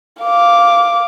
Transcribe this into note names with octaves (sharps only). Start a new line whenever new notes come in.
F5 D6